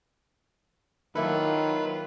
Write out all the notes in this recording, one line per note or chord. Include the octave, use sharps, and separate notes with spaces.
D#3 F#3 A#3 E4 F4 A4 B4